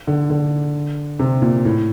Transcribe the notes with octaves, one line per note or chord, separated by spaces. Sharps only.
D3
D3
C3
A#2
A2